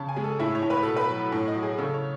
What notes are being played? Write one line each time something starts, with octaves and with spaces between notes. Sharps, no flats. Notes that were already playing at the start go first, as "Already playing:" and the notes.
Already playing: C#3 A5
G#5
G#3
A4
A2 E4
C#5
A2
B4
B2 A4
B4
F#3
A2
D#5
F#3
G#4
C#3 A4
C#5